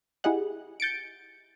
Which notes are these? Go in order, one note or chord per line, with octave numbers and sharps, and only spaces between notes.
E4 G4 G#4 D#5 F#5
G6 A6 C#7 D7